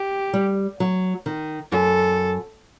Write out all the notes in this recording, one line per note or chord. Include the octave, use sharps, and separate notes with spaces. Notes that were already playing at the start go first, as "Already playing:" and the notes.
Already playing: G4
G3
F#3
D#3
F#2 A4